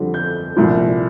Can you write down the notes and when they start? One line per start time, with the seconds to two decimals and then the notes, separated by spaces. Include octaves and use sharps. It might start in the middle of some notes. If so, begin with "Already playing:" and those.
Already playing: F2 D3 G3
0.14 G6
0.56 C2 A#2 F3